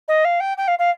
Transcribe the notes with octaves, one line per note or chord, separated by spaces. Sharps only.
D#5
F5
G5
G5
F5
F5